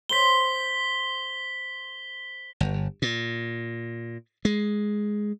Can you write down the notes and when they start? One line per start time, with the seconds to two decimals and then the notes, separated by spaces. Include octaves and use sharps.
0.09 C5 B5 B6 G7
2.61 G1
3.02 A#2
4.45 G#3